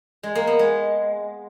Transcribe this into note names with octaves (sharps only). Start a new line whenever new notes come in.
G#3
A#3
B3
G#3